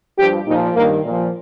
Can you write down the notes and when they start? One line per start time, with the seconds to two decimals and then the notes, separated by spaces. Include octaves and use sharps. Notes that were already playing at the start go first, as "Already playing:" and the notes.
0.18 G2 F3 G4
0.46 A#2 F3 D#4
0.75 G2 D#3 A#3
1.04 A#2 F3